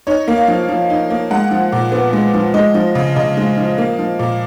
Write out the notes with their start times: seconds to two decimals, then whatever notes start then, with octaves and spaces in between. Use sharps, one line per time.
0.07 D#4 C#5
0.28 A#3
0.38 F5
0.48 F3
0.69 F3
0.90 D#4
1.10 A#3
1.31 G#3 F#5
1.51 F3
1.72 A#2
1.92 B3
2.13 G#3
2.34 F3
2.54 G#3 D#5
2.74 F3
2.95 C#3
3.16 C#3 D#5
3.37 G#3
3.57 F3
3.78 A#3
3.99 F3
4.19 A#2